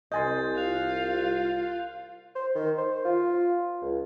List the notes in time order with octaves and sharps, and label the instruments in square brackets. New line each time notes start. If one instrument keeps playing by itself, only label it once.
[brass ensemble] C2 [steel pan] D#5 G#5 C6 [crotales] G6 A6
[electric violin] F4 F5 [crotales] F#6 F7
[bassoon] C5
D#3
C5
F4
C#2